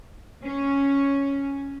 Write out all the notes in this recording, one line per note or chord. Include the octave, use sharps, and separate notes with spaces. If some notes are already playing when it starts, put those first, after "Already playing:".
C#4